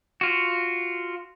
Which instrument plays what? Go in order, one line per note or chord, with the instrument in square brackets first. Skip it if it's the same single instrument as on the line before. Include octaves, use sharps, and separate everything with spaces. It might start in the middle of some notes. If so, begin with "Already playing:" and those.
[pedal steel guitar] F4 F#4